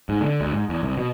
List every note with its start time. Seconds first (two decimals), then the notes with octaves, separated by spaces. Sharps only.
0.09 G#2
0.21 D3
0.41 D2
0.54 G#2
0.69 E2
0.83 C2
0.98 B2